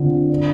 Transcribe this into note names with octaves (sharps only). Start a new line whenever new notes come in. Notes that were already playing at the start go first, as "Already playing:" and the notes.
Already playing: D3 C4 F4
D4